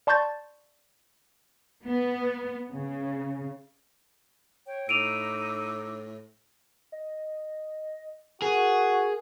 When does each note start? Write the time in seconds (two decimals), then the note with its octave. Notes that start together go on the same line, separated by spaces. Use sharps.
0.07 D5 A5 C6 C#6 G6 A6
1.85 B3
2.72 C#3
4.66 C#5 G5
4.89 A2 D#4 D6 E6 D7 D#7 F7
6.92 D#5
8.42 F#4 G#4 A#4